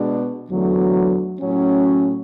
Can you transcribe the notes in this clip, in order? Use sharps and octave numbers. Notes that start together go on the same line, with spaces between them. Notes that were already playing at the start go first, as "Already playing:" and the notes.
Already playing: B2 G#3 D4
E2 D3 F#3 A3
A2 F#3 C#4